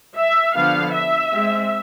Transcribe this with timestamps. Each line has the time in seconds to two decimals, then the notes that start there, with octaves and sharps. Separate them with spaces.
0.17 E5
0.55 D3 F3 B3 F5
0.94 E5
1.33 G#3 C4